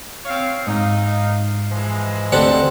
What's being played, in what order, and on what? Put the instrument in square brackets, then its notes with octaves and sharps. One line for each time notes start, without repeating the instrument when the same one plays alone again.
[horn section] C4 C#5 F5
[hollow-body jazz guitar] G#2 [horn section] D#4 F5
[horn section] E3 F3 G#3
[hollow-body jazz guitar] D2 G4 A4 [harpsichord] C4 D4 F#5